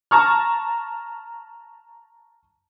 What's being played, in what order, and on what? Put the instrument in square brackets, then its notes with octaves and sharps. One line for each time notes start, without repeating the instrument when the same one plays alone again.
[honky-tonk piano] A5 A#5 C#6 F6